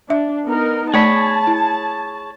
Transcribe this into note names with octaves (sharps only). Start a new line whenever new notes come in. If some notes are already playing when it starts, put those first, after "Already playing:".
D4 E5
B3 D#4 A#4
A3 G#4 C#5 D5 A5 B5
E4